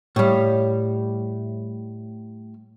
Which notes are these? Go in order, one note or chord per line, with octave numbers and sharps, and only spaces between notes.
A2 G3